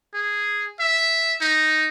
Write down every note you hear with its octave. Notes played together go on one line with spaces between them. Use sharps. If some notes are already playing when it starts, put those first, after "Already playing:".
G#4
E5
D#4